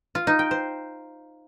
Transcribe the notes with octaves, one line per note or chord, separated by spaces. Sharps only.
F4
D#4
G5
C5